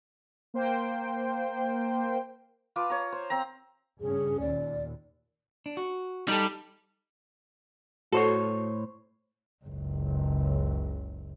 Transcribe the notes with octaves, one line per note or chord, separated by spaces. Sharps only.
A#3 C5 G5
F4 B4 A5 D6
C#5 A#5
C5
C4 C5 A#5
G2 C#3 C#4 G#4
D#2 A#2 D5
D4
F#4
G3 D#4 G#4 A4
A2 F#4 A4 C5 C#5
F#1 C#2